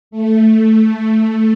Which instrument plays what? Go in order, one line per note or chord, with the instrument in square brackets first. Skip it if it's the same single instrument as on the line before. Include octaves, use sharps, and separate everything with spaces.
[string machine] A3